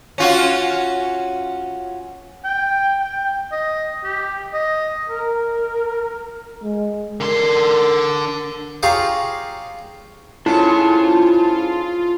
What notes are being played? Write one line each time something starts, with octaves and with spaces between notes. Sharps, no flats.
C#4 F4 F#4
G5
G5
D#5
G4
D#5
A#4
G#3
D3 A#4 C6
F4 G4 G#4 C#5 F5 A#5
G#2 C#4 E4 F4 A4 A5